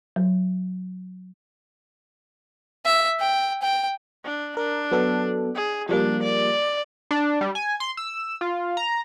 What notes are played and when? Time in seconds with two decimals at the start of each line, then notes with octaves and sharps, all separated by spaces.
0.16 F#3
2.86 E5
3.20 G5
3.62 G5
4.25 D4
4.57 D4 A#4
4.91 F#3 B3 A4
5.56 G#4
5.89 F3 G3 A#3 D4
6.23 D5
7.11 D4
7.41 G3
7.55 G#5
7.80 C6
7.97 E6
8.41 F4
8.77 A#5